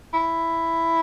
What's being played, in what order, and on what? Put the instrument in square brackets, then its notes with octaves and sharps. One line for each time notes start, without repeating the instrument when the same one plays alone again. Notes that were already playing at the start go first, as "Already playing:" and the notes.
[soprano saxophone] E4